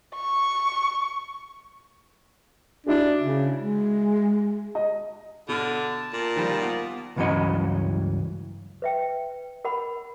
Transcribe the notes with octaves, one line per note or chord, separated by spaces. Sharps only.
C#6
D4 E4 F#4 G#4
C#3
G#3
D#5
B2 D3 A5 F6
A#2
D#3 F3 G3
B3 F4
C#2 G2 E3 F#3 C#4 D#5
B4 E5 G5
A#4 F#5 B5